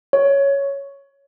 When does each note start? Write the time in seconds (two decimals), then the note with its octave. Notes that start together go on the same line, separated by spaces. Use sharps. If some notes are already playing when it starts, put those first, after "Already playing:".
0.13 C#5